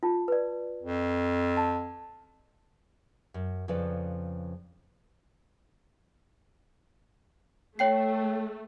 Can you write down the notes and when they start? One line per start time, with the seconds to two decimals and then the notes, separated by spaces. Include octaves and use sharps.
0.03 F4 A5
0.28 B4 D5
0.83 F2
1.57 A5
3.34 F#2
3.68 F2 C#3 F3 B4 D5 A5
7.79 A3 C#5 G5 C7